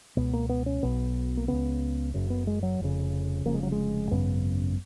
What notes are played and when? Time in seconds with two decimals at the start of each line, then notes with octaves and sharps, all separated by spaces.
0.17 C#2 B2 B3
0.33 A#3
0.49 B3
0.66 C#4
0.82 B1 B2 B3
1.37 A#3
1.48 C#2 C#3 B3
2.14 F#1 F#2 C#3
2.30 B3
2.47 G#3
2.63 F#3
2.80 F1 F2 C#3
3.45 F1 F2 C#3 A#3
3.54 G#3
3.63 F#3
3.72 G#3
4.11 G#1 F#2 C#3 B3